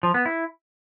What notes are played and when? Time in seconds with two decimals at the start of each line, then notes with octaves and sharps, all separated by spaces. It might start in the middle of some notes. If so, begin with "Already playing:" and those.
0.03 F3
0.14 B3
0.26 E4